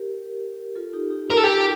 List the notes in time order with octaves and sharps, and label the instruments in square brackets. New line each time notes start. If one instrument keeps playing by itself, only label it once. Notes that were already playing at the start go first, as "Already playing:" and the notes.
Already playing: [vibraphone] G4 A#4
F4 A4
D#4 G4
D#4 G4
[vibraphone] F4 [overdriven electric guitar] A#4
[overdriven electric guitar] A4
G4